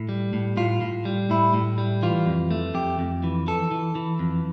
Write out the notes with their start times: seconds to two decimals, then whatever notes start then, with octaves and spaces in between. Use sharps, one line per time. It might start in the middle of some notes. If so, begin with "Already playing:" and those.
Already playing: A2
0.09 G3
0.33 A2
0.57 A2 F4
0.81 A2
1.05 G3
1.30 A2 E4
1.54 A2
1.78 G3
2.03 E3 F4
2.26 F2
2.51 A3
2.74 F2 G4
2.99 F2
3.24 E3
3.47 E3 A4
3.71 E3
3.95 E3
4.19 F2